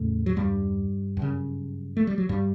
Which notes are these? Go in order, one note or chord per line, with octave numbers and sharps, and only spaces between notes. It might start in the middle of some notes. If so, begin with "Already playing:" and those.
Already playing: E2 A2 C#3 A3
F#3
G2 G3
F#2 C#3
A3
G3
F#3
G2 G3